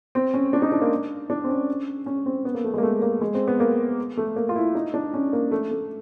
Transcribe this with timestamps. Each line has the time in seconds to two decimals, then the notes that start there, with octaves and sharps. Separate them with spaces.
0.15 C4
0.34 C#4
0.53 D4
0.62 D#4
0.72 D4
0.82 A#3
1.30 D4
1.44 C4
1.49 C#4
2.06 C#4
2.26 C4
2.45 B3
2.54 A#3
2.64 A3
2.74 G#3
2.78 A#3
2.83 A3
3.02 A#3
3.21 G#3
3.34 C4
3.48 B3
3.60 A#3
4.17 A3
4.36 A#3
4.49 F4
4.56 E4
4.75 D#4
4.94 D4
5.14 C#4
5.33 A#3
5.51 A3
5.71 A3